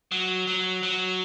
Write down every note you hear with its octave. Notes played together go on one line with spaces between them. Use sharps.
F#3
F#3
F#3